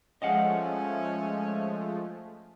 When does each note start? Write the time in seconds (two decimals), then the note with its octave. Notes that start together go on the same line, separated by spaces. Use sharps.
0.22 F3 G#3 A3 C#4 D#5 F5 F#5